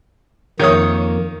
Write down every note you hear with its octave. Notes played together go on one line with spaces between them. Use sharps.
F2 D#3 A#3 C#5 D#6